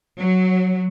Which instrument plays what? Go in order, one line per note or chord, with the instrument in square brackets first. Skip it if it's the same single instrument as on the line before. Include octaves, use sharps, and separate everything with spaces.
[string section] F#3